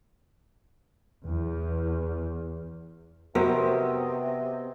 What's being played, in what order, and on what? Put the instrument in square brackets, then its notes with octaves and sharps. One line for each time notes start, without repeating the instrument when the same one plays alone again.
[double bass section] E2
[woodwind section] C3 [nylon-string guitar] B3 [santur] C4 D#5 [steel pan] F#4 A#4